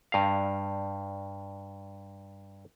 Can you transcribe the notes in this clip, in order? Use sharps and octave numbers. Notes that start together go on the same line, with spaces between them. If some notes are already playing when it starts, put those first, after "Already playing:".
G2 F5